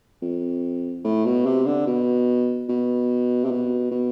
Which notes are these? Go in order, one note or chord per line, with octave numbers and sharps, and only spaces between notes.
F2
A2
B2
C3
D3
B2
B2
C3
B2
B2